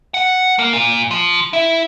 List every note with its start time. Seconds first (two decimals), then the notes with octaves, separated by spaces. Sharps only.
0.14 F#5
0.59 A#3
0.73 A#2
1.11 F3
1.53 E4